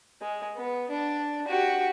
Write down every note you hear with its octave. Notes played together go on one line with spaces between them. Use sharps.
G#3
B3
D4
F#4 G4